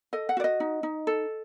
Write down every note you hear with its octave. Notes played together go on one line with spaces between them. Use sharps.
A4 D#5
F#5
F#4 D5
D#5
D#4
D#4
A4